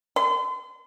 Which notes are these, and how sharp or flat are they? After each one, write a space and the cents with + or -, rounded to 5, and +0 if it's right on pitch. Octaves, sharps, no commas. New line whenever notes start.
C6 -40